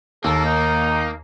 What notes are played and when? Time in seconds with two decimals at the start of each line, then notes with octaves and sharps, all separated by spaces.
0.24 D#2 A#3 A4
0.45 D#4